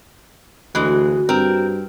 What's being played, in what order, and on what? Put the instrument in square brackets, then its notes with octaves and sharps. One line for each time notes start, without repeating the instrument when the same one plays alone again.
[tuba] D2 [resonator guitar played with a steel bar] E3 G#3 [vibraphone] F#4
[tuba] G2 [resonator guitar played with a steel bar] C4 A#4